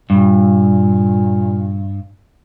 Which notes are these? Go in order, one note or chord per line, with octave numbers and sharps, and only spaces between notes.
G2 A#2